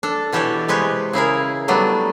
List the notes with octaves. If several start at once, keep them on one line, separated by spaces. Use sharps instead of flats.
D4 A4
B2 E3 G4 A4 C#5 D5
C3 G#3 G4 B4 C#5
C#3 E4 G#4 A#4
F#3 G3 A3 B3 D4